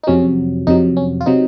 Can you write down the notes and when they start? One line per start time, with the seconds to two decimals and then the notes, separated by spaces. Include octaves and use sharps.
0.03 D#4
0.07 F2 C3 F#3 C#4
0.67 F2 C3 F#3 D#4
0.97 C#4
1.21 F4
1.26 C3 F#3 D#4